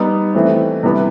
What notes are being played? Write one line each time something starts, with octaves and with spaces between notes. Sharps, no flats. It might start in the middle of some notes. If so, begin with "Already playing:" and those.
Already playing: G3 B3 D#4
E3 A3 C4
C3 E3 G3 B3